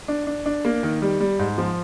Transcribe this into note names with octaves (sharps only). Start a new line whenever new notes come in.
D4
D4
D4
A#3
D#3
G3
G3
G#2
F3